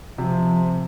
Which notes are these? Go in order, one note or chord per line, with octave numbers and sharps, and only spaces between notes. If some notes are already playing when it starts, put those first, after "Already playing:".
C3 F3